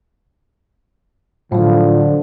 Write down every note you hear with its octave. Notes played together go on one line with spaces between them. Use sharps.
A2 D3 F3 F#3